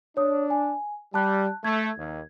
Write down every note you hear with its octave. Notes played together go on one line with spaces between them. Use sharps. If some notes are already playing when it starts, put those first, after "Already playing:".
D4 C#5 D#6
G#5
G3 A5 F#6
A3 G#6
D#2 D#3